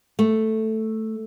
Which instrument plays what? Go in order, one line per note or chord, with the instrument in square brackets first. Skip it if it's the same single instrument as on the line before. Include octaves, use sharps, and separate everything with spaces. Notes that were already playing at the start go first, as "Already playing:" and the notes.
[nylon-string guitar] A3